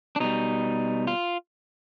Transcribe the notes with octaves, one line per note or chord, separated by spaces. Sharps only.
D4
B2 G3 D#4
F4